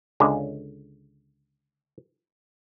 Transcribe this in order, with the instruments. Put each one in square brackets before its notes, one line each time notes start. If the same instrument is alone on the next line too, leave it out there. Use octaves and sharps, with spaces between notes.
[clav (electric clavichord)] C#2 D3 G#3